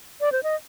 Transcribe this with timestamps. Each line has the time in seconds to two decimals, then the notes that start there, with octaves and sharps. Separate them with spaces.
0.21 D5
0.32 C5
0.43 D#5